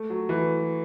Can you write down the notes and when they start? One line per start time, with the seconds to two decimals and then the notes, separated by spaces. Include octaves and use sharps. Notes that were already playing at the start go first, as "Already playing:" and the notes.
Already playing: A3
0.10 F#3
0.29 E3